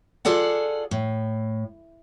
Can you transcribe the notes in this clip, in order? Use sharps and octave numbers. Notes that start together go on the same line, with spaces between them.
F4 G#4 A4 D5 F#5
A2